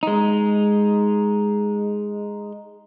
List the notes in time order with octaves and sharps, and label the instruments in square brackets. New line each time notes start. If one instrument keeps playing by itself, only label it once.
[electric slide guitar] G#3 D#4